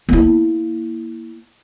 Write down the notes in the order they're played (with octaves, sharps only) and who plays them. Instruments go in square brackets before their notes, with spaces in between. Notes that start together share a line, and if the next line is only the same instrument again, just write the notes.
[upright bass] A#3 E4